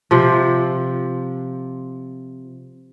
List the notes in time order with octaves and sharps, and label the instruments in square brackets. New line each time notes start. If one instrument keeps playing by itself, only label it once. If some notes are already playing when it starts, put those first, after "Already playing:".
[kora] C3 F3